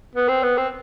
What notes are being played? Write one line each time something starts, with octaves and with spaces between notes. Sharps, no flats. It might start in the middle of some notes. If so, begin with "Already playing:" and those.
B3
C4
B3
C4